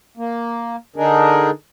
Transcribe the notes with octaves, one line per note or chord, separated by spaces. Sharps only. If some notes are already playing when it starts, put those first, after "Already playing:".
A#3
D3 D4 D#4 G#4 A#4